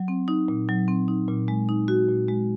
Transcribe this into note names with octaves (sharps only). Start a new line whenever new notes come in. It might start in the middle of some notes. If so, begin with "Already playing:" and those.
Already playing: F#3
C4
D#4
A#2
F#3
C4
D#4
A#2
G#3
D#4
F#4
A#2
G#3